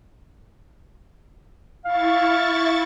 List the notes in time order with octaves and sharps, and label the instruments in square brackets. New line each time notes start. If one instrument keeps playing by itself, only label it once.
[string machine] E4 C#6 A6 [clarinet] F5